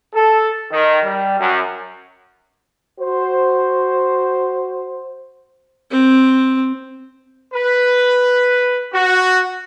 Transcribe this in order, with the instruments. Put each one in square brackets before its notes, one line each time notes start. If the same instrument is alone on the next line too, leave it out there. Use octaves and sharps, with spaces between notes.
[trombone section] A4
D#3
G3
F#2
F#4 C5
[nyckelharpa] C4
[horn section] B4
F#4